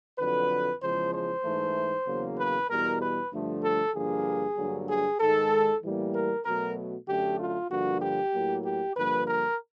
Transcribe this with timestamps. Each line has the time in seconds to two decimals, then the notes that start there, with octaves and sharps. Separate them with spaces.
0.18 F2 D3 F#3 B4
0.82 E2 C#3 F3 G#3 C5
1.13 C5
1.44 G#2 E3 A3
2.07 E2 C#3 F#3 A#3
2.39 B4
2.69 E2 B2 G3 A#4
3.01 B4
3.32 G2 D3 F3 A3
3.63 A4
3.95 G2 D3 F3 A#3 G#4
4.57 G2 D3 F#3 A#3
4.89 G#4
5.20 G#2 D#3 G#3 A4
5.83 A2 E3 G3 A#3
6.14 A#4
6.45 B2 F#3 A3 A#4
7.08 F#2 D3 F#3 A3 G4
7.39 F4
7.70 G2 D3 F3 A#3 F#4
8.02 G4
8.33 A2 F#3 A#3
8.64 G4
8.96 G2 D3 F3 A#3 B4
9.27 A#4